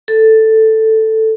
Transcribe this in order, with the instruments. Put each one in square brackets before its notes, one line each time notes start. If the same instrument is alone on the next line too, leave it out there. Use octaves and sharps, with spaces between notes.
[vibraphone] A4